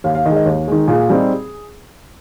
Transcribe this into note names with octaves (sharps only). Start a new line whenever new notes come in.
D#2 F5
F5
D#3 G#3 D#5
D#5
D#2
D#3 G#3
A#2 G#4
G3 C4 D#4